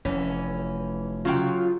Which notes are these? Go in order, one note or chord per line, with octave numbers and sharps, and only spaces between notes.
F1 E3 C#4
C#3 F#3 F4 G5